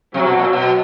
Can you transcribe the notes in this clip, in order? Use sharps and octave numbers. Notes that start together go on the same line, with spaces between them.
C3 F#3
B2
A#2
B2